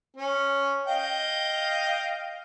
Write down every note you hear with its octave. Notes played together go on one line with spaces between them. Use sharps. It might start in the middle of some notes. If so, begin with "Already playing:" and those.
C#4
D#5 F5 G5